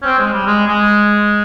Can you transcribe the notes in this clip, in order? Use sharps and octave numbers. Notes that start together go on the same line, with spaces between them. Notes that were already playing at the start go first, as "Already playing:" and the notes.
C#4
C4
G#3
G3
G#3
G#3